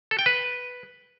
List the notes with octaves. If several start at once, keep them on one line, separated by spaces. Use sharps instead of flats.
A4
G5
B4